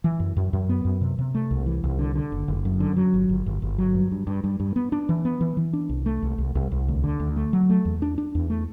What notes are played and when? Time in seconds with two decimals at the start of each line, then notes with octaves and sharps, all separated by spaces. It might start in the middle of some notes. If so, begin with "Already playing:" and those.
0.04 E3
0.20 F#2
0.37 F#2
0.53 F#2
0.69 B3
0.85 F#2
1.01 C3
1.19 C3
1.35 A3
1.51 C2
1.66 E3
1.84 C2
1.99 D3
2.16 D3
2.32 F#1
2.48 F#1
2.65 F#2
2.80 D3
2.97 F#3
3.14 G1
3.29 G1
3.46 G1
3.62 G1
3.78 F#3
3.95 G2
4.11 G2
4.27 G2
4.44 G2
4.60 G2
4.76 B3
4.92 D4
5.09 E3
5.25 B3
5.41 E3
5.57 E3
5.73 D4
5.89 C2
6.06 A3
6.22 C2
6.38 C2
6.55 C2
6.72 C2
6.88 D2
7.04 D3
7.20 D2
7.36 A3
7.53 F#3
7.70 A3
7.85 E2
8.02 D4
8.18 D4
8.35 E2
8.50 A3